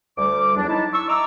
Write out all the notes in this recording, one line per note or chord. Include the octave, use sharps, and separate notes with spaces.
D2 G3 D6
E2 F#3 D4
D#4 E4 A5
C#6 E6
D#5 E5 A#5 D6 E6